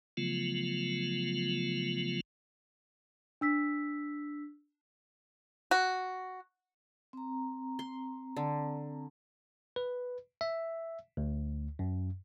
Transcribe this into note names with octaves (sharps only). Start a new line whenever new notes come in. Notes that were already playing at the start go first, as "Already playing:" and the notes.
C#3 F3 F#3 A3 B3 F4
D4 E6 B6
F#4
C4 A#5
C6
D3
B4
E5
D2
F#2